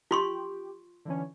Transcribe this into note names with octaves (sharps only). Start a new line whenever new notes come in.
F4 G4 C6 C#6
D3 E3 C#4